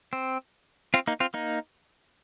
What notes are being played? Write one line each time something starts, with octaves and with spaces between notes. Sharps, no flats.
C4
C4 F4
A#3 D#4
C4 F4
A#3 D#4